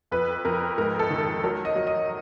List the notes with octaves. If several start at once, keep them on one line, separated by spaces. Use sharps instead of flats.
F2 B4
F2 A#4
G#2 A#4
A4
D#3
A4
F#3 A#4
D#5
F#3
D#5